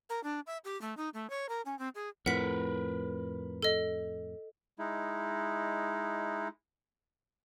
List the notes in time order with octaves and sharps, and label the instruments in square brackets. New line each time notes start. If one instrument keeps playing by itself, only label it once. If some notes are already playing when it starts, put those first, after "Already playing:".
[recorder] A#4
D4
E5
G4
A3
D#4
A3
C#5
A#4
C#4
C4
G#4
[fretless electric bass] F2 A2 [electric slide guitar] A#4 B4 [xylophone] F#5 B6
[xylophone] A4 D#5
[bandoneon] G#3 D#4 E4